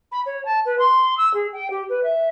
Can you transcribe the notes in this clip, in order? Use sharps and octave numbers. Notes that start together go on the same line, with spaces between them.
B5
C#5
A5
B4
C6
E6
G#4
G5
G4
B4
E5